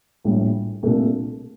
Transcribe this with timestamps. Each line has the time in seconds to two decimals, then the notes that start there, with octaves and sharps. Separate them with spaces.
0.24 A#1 A2 G3
0.83 C2 A#2 A3 D4